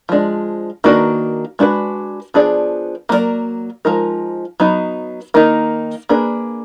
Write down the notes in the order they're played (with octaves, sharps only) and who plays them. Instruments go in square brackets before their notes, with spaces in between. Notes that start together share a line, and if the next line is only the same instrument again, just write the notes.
[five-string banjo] F3 G#3 D4
D#3 A#3 D4 F#4 B4
G#3 D4 F#4 B4
F3 B3 D4 G#4 D5
F#3 A#3 F4 A#4 D5
F3 G#3 D#4 A#4
F#3 B3 D#4
D#3 A#3 D#4
A#3 D4 G#4 B4